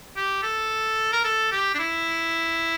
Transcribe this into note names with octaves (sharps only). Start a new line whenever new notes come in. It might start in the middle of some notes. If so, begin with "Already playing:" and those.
G4
A4
A#4
A4
G4
D4
E4